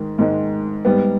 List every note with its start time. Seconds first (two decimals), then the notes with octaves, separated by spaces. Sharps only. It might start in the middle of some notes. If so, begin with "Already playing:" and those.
Already playing: G#2 D#3 G#3
0.19 G#2 D#3 G#3
0.85 G#2 G3 B3